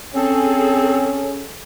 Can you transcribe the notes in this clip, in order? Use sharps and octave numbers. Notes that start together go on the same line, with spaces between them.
C4 C#4 G#4 A4